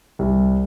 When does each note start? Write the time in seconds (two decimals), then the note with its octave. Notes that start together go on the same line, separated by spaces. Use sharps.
0.19 C2